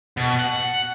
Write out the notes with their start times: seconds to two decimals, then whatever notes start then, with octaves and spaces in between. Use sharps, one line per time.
0.17 B2
0.39 F#5